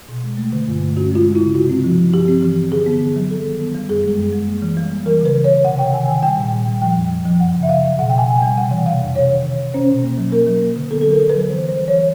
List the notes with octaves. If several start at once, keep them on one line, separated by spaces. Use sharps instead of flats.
B2
G#3
A3
D3
G2
A3
C#4 F#4
G#3 F4
G#3
C#3 E4
C3 F#4
C4
F3
F3
G2 G4
C4
E3
C4
D3 G#4
B3
B3
F#3
G3 A4
D#3
B3
G3
F#2 G#4
G#3
F#2
G#3
A#3
E3
G3
A#3
E3 A#4
C#3 B4
E3
C#5
C#3
C3 F#5
C3 G5
D#3 G#5
D#3 G5
G3 G5
A#2
A#2
G3
F3 G5
F2
F2
F3
F#2 F#5
C#3
E5
C#3 F5
F#3
B2 F#5
G5
B2
G#5
B2
G5
G3
C3 F#5
E3
C3 F5
F2
C3 C#5
D#3
C3
C3
C#4 C5
B2
A#3
F#3
A#3 A#4
F#3
A#3
D3
B3 A4
F#3 A4
A#4
D3
B4
F#3
E3 C5
G3 C5
E3
C#5
E3